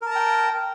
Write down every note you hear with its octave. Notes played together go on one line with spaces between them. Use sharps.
A#4 G5 A5 A#5